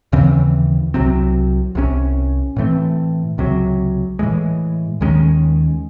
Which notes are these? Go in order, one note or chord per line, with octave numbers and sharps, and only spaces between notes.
D#2 C#3 E3 C4
C2 C3 F#3 C4
C2 C3 F#3 C#4
A2 E3 A3 C4
C#2 C3 F#3
A2 E3 G#3
D#2 D#3 G#3 C#4